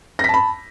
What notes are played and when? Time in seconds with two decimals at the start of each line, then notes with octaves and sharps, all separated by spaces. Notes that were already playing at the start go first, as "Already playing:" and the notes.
0.19 A#6
0.24 B6
0.29 A5
0.34 B5